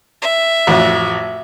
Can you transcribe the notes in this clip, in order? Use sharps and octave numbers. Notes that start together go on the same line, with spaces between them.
E5
A1 F2 F#4